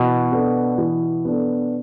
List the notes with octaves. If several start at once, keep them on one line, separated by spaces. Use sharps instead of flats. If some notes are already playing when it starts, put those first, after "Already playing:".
Already playing: B2 E3
B3 D4 A4
E3
B3 D4 A4